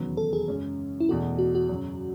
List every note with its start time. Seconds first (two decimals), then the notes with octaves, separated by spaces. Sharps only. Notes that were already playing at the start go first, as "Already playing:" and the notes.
Already playing: E1 D#2 C#3 F#3 B3
0.17 A4
0.33 G#4
0.48 F#2 C#3 G#3 C#4
1.00 E4
1.09 E2 B2 A3 F#4
1.39 F#4
1.55 F#4
1.69 F#2 C#3 F#3